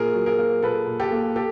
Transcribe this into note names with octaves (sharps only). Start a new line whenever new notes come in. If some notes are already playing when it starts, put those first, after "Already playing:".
Already playing: A#2 G#4 A#4
F#3
G#4 A#4
A#3
A#2 A4 B4
A#2
G4 A4
A#3
G4 A4